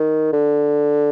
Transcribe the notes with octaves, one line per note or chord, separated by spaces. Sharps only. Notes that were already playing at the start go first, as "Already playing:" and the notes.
Already playing: D#3
D3